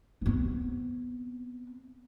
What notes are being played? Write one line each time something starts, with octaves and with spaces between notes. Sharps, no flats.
B3 C4